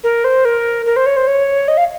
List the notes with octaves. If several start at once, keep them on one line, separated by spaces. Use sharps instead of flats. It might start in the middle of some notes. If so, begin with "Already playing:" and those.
A#4
C5
A#4
A#4
C5
C#5
C5
C#5
D#5
F5